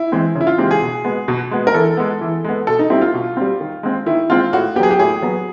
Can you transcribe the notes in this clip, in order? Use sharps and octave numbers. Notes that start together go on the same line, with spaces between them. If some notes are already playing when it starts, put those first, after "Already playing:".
Already playing: E4
E3 G#3 C4
C#3
E4
F4
E3 G#3 C4 G4
G#4
B2
G#3 B3
B2
G#3 B3
A#4
E3 A4
G#3 B3
E3
G#3 B3
B2 A4
D#4
G3 C4 E4
F4
B2
G3 C4
D#3
G#3 C4
D#3 E4
G#3 C4 F4
A2 F#4
F#3 B3 G4 G#4
G4
A2 G#4
F#3 B3